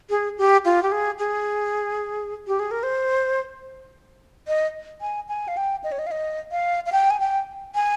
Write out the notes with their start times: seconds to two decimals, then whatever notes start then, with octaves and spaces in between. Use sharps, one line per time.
0.10 G#4
0.38 G4
0.65 F4
0.83 G4
0.92 G#4
1.19 G#4
2.47 G4
2.59 G#4
2.71 A#4
2.83 C5
4.48 D#5
5.01 G#5
5.28 G#5
5.48 F5
5.57 G5
5.84 D#5
5.92 C#5
5.99 D#5
6.07 F5
6.11 D#5
6.51 F5
6.86 F5
6.92 G5
7.10 G#5
7.20 G5
7.75 G#5